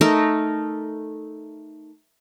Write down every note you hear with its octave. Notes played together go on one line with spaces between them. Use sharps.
A3 D#4 A4 A#4